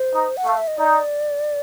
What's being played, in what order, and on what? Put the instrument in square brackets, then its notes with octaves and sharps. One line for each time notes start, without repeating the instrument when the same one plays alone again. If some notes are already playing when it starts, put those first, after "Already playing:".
Already playing: [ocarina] C5
[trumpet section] D#4
[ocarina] F#5
[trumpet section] A3 [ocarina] F5
[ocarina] E5
D#5
[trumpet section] D#4 [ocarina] D5